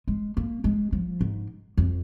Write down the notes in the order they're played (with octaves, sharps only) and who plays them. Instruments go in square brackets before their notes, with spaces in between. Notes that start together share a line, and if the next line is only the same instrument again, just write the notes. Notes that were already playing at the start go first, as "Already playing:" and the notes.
[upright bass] G#3
A#3
G#3
F3
G#2
F2